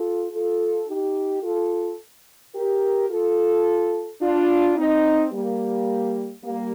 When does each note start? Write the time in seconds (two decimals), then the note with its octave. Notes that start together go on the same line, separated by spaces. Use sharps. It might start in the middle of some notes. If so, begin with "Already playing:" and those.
Already playing: F4 A4
0.32 F4 A4
0.88 D#4 G4
1.43 F4 A4
2.55 G4 A#4
3.10 F4 A4
4.21 D4 F4
4.76 C4 D#4
5.32 G3 A#3
6.44 G3 A#3